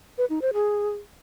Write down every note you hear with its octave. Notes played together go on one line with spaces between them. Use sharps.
B4
D#4
C5
G#4